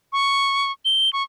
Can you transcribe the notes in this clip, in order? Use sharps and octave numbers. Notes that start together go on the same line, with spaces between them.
C#6
G7
C#6